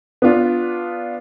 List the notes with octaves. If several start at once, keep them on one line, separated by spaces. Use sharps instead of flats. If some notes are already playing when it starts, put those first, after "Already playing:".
B3 D4 F4